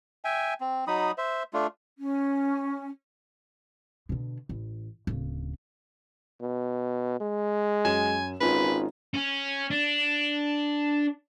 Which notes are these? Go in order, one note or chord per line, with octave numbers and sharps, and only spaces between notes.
E5 G5 G#5
C4
F#3 D#4 B5 D#6
C5 E5
A3 D4 F4
C#4
B2 D3
A1
D1 C#3
B2
G#3
F#2 G#5 E7
G#1 C#4 D#4 F4 B4
C#4
D4